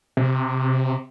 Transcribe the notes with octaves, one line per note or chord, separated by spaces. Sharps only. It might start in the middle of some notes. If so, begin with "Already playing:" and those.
C3